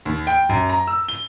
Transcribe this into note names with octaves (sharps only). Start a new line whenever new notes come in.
D#2
G5
F#2
A#5
E6
G7